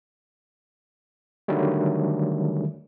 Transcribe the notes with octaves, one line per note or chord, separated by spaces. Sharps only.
D3 D#3 F#3 G3 A3